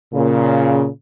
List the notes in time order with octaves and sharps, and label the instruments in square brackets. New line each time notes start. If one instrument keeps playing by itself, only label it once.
[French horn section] A#2 C#3